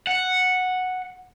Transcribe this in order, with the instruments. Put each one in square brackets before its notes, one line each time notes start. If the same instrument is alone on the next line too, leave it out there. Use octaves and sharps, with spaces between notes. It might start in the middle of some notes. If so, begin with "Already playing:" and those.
[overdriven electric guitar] F#5